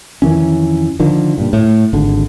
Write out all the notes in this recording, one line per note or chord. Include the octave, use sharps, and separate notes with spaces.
F2 D#3 E3 C#4
D3 D#3 F3
G2 A#2
A2
G#1 D3